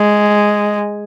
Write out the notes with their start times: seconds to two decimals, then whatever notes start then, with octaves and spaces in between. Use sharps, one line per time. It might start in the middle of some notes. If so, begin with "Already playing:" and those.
Already playing: G#3